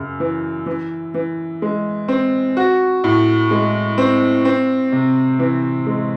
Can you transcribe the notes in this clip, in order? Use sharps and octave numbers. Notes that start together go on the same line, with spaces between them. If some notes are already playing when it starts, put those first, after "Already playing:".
Already playing: F#2 C#3
E3
E3
E3
G#3
C4
F#4
A2
G#3
C4
C4
C3
E3
G#3